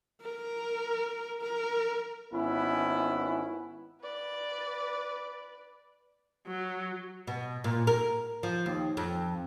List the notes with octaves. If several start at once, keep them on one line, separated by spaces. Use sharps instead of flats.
A#4
A#4
G#1 B3 C#4 E4 B4
B4 D5
F#3
B2
A#2
A#4
F3
D#2
F2